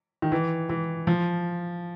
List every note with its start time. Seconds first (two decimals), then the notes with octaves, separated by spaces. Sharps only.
0.22 D#3
0.32 E3
0.69 E3
1.07 F3